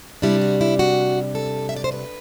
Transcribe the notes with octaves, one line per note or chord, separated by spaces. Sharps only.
C3 G3 D4 E4
F#4
E4
F#4
A4
E5
D5
C5
B4